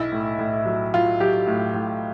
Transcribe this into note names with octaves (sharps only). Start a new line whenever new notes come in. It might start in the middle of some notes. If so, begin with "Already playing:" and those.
Already playing: B1 E4
A2
A2
F#3
F#3 F4
F#3 G4
A2
A2